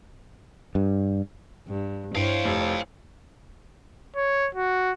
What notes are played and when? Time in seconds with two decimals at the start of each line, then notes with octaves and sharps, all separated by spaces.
0.75 G2
1.68 G2
2.15 G2 E4 C5 C#5 F5 G5
2.45 F1
4.16 C#5
4.55 F#4